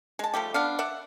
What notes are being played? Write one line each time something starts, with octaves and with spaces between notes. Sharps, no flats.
G#3 A5
F3 G3 A3 G4
B3 D4 F5
D5 E5 F#5